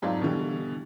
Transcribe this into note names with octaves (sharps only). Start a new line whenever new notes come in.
F2 G#2 F#3 F4 D5 F5
B2 D3 E3 G3